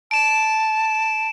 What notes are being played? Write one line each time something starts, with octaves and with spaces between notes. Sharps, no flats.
A5 D7 E7